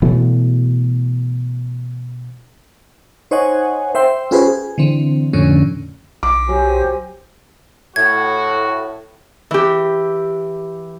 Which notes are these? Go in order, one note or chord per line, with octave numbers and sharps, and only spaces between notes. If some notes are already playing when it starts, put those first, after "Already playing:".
B2 E3 F#3 A3
D#4 C5 C#5 D#5 F#5 G#5
C5 E5 G5 C6
C#4 F4 G4 G#4 B4 C5
G#4
D3 E3 C4
F2 A2 D3 C#4
B1 D6
F#3 G4 C5 G#5
A2 F#4 G#6
E3 G4